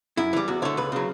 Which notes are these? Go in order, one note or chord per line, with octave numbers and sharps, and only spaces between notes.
F#2 E4
E3 G3
E2 F#4
D3 A3 C#5
C#2 B4
C#3 F#3